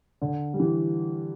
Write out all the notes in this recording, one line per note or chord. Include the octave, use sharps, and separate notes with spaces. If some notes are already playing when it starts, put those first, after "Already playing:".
D3
G3
E3